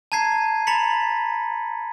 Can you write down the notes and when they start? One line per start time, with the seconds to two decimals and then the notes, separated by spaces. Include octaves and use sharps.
0.12 A5 A#5 G#6 C7 D#7
0.67 A#5 B5 A6 B6 C#7 F#7